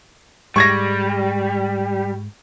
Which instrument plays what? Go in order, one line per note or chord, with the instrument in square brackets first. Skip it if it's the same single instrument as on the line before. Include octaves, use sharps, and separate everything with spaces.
[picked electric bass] G#2 G#3 [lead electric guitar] G3 [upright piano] C#6 G#6 A#6